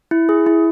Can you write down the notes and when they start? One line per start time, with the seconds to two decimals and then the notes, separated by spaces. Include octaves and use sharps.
0.11 E4
0.29 G#4
0.46 E4